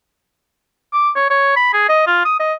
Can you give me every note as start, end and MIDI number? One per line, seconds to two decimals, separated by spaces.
0.93 1.10 86
1.16 1.27 73
1.30 1.54 73
1.56 1.73 83
1.74 1.88 68
1.89 2.05 75
2.07 2.25 65
2.25 2.38 87
2.40 2.53 75